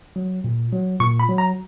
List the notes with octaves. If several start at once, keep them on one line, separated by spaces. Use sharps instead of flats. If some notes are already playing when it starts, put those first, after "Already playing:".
F#3
A#2
F#3
A#2 C#6
B5
F#3
A#5